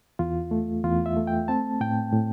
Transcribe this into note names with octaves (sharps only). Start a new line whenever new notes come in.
E2 F4
A3
E2 F4
E5
A3
G5
C4 A5
A2 G5
A2